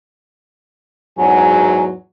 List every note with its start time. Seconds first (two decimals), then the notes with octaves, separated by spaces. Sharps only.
1.18 E2 G#2 F#3 G#5